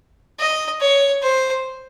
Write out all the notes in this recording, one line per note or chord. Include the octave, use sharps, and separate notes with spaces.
D#5
C#5
C5